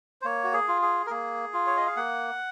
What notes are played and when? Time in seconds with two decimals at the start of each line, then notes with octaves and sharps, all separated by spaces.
0.21 C5
0.25 A#3 C#5
0.44 F#4
0.53 G#4
0.68 F4
0.82 G#4
1.07 A#4
1.10 A#3 G#4
1.54 F4
1.67 C#5
1.77 D#5
1.87 F5
1.96 A#3 F#5